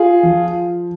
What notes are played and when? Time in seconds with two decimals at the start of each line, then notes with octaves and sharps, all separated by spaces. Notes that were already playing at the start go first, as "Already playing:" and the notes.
Already playing: F4 G#4
0.23 F3